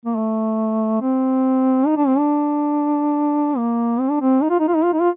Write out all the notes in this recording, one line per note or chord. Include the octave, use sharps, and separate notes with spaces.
A#3
A3
C4
D#4
D4
C4
D4
A#3
C4
D4
C4
D#4
F4
D#4
F4
D#4
F4
D#4
F4